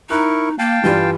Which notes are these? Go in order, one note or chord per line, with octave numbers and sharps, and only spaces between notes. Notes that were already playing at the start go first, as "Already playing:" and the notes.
D#4 E4 A#4 C#6 F#6
A#3 F5 G5 A5
G2 E3 G3 F4